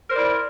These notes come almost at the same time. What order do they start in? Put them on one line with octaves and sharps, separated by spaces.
A#4 C5 D5 E4